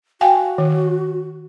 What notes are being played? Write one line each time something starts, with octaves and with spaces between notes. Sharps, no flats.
F#4 F5 G5 G#5
D#3